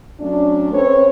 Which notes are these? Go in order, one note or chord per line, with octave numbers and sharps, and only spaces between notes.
F#3 A3 C#4 D4
C4 C#4 A4 B4 C#5